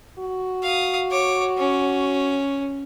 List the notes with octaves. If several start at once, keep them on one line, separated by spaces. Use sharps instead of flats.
F#4
F5 D#6
C#5 D6
C#4